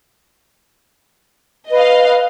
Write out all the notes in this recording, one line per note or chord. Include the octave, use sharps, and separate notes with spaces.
B4 D#5 F5